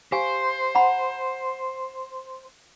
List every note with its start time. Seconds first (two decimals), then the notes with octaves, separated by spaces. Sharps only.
0.12 G4 C5 F5 G#5
0.75 F#5 A#5 B5